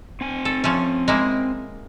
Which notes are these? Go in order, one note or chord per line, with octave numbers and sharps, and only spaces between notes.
C4 G#5
A4
F3 A3 C#4
G#3 A#3 E4